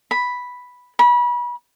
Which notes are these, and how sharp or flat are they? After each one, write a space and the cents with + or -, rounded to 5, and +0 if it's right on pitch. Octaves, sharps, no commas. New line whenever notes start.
B5 +0
B5 -30